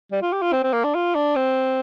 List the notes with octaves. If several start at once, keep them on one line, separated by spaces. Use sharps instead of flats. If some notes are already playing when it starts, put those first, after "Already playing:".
G3
F4
G4
F4
C4
C4
A#3
D4
F4
D4
C4